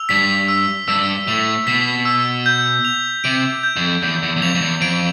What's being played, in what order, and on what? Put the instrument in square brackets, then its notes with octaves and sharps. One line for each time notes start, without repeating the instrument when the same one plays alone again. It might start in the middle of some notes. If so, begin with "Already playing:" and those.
Already playing: [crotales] E6 F7
[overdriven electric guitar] G2 [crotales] B6
[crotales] E6
[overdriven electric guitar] G2 [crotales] E6
[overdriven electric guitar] A2 [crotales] F7
[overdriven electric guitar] B2 [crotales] B6
[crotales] E6
G6
F7
[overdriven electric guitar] C3 [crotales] D7
[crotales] G6
[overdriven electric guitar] F2
[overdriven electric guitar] E2 [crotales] G6
[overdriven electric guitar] E2
E2
[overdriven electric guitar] F2 [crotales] F7
[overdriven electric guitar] F2
E2
[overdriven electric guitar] F2 [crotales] D7